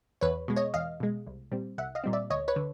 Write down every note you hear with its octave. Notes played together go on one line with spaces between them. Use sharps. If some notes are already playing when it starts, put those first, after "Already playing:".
E2 B4 C#5
B2 G#3
C#5 D#5
E2 D#5 F5
B2 G#3
C2
A#2 G3 C4
C2 E5 F#5
D#5 F5
A#2 G3 C4
D5 E5
D2 C#5 D#5
B4 C#5
D3